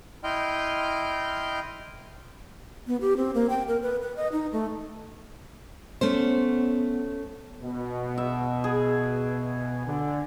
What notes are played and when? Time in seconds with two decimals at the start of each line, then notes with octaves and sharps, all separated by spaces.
0.24 E4 D#5 G5 C6 F6 G6
2.87 B3
3.01 G4
3.17 C4
3.34 A#3
3.50 G5
3.68 A#4
3.82 B4
4.02 B4
4.16 D#5
4.32 D#4
4.52 A3
6.01 A3 B3 C#4 C5
7.62 B2
8.18 E5
8.64 G#4
9.86 D3